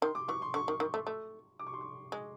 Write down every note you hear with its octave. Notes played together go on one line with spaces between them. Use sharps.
D#3 C6
D6
E3 C#6
C6
D3 C#6
D#3
D#3
A3
A3
D6
C#6
C6
C#6
G#3